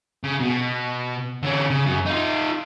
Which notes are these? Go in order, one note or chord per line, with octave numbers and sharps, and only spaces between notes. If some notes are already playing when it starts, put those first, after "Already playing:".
C#3
B2
D3 C#4
C#3
F#2
D#4 F4